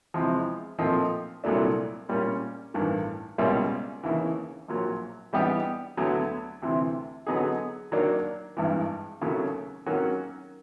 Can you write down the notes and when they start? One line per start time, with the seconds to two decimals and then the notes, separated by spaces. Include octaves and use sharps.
0.14 E2 C3 F3 G#3
0.79 A#2 F3 A3 C4 D#4
1.44 C2 A#2 F#3 A3 D4
2.09 A#2 G3 A#3 C#4
2.74 A1 G2 D#3
3.38 C#2 B2 G3 A#3 C#4
4.03 D#2 C#3 E3
4.68 A#1 A#2 F#3
5.33 E3 G3 B3 D#4 G4
5.97 D2 D3 F#3 B3
6.62 D2 C3 E3
7.27 D3 F#3 B3 D#4 G#4
7.92 D#3 F#3 A#3 D4
8.57 G#1 G2 E3
9.21 D#2 C#3 F#3 A3
9.86 D#3 F#3 A#3 C#4 F#4